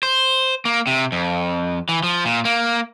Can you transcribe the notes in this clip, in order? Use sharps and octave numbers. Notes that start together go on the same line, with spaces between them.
C5
A#3
C3
F2
E3
F3
A#2
A#3